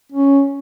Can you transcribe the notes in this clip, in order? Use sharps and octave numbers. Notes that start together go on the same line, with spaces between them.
C#4